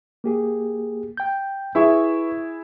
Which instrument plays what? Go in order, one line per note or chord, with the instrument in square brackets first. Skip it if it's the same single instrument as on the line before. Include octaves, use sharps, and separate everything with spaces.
[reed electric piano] A#3 G4 G#4
G5 G6
[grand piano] E4 G#4 E5 [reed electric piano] B4 C#6